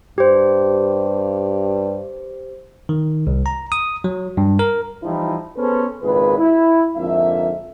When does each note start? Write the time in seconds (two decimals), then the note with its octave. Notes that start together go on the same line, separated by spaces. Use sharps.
0.18 G2 G4 C5
2.89 D#3
3.27 C2
3.46 A#5
3.72 D#6
4.04 F#3
4.37 G2
4.59 A#4
5.03 E3 F3 G3 D#4 E4
5.56 B3 C#4 G#4 A4 B4 C5
6.02 G#1 C#2 A#2 G#4 B4
6.38 E4
6.96 F2 G#2 D3 A#3 E5